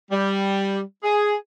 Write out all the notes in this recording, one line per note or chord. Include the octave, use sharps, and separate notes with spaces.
G3
G#4